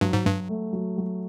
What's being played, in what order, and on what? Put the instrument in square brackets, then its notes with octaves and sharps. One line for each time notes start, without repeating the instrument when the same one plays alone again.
[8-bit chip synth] G2 [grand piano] F#3
[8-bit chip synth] G#2
[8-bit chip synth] G2 [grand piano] F#3
[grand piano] A3
F#3
F#3